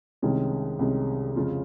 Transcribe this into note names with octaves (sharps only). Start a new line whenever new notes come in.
C2 C3 D#3 G#3 C#4
C2 C3 D#3 G#3 C#4
F2 C#3 G#3 C#4 F4